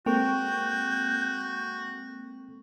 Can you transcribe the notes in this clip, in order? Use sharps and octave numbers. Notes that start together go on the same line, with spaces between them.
G#3 A#3 C4 F#4 A4 G5 C#6 G6